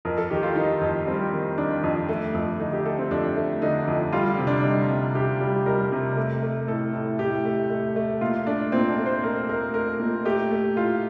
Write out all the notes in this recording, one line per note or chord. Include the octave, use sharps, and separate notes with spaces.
F2 A#4
A4
D#3 G4
F4
D#3 D#4
F2
G3 C4
D#3
D#3 D4
F2
A3
F2
D3 D#4
G4
A3 A4
C4
F2 D4
A3
D3 D#4
F2
G3 F4
C3
D4
G3 D#4
C3
C3 G4
G3
G3 A#4
C3
A3
A3
A2 A4
A2
A2 G4
A3
A3
A3
A#2 F4
A3 D4
A#2 C4
D4
A3
C5
A3 A#4
A3 A#4
A3 A#4
A#2
A3 G4
A3
A2 F4